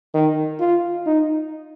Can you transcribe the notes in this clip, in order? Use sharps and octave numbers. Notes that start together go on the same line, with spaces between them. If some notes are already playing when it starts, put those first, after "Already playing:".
D#3
F4
D#4